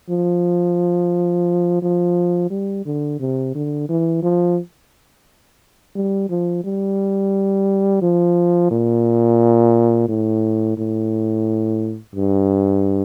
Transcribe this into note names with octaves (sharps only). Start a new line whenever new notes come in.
F3
F3
G3
D3
C3
D3
E3
F3
G3
F3
G3
F3
A#2
A2
A2
G2